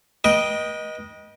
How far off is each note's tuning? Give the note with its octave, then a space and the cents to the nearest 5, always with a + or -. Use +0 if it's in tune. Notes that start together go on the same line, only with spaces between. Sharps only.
B4 -40 D#5 +0 G5 +0